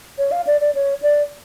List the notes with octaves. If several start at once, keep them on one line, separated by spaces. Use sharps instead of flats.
C#5
F5
D5
D5
C#5
D5